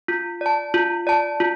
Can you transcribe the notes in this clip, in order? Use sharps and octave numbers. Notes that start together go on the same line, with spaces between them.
F4
D5 A5
F4
D5 A5
F4